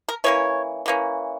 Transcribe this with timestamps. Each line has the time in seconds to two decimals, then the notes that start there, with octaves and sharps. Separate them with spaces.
0.08 A#4
0.24 E3 A#3 C#4 C#5
0.86 E3 A#3 C#4